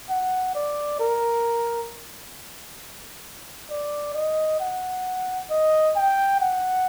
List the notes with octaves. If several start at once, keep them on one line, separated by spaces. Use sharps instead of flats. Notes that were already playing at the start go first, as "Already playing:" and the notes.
F#5
D5
A#4
D5
D#5
F#5
D#5
G5
F#5